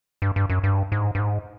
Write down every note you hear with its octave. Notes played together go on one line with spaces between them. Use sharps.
G2
G2
F#2
G2
G#2
G2
G#2